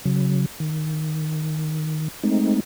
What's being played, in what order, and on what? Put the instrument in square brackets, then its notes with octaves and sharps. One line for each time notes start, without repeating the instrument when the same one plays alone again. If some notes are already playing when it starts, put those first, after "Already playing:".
[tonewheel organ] C#3 F#3
D#3
G#3 A3 C4 D#4